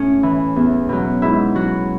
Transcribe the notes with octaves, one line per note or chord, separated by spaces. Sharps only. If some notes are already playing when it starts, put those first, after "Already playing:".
Already playing: A2 C#4
E3
E2
B2 F#3
G#2 E4
F#3 F#4